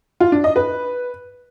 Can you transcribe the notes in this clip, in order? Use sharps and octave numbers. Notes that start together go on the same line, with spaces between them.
F4
D4
D#5
B4